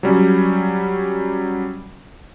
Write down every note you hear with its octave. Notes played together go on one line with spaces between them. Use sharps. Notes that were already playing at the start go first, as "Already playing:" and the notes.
F#3 G3 C#4